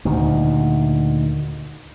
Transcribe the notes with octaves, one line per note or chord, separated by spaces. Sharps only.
D2 A#2 D#3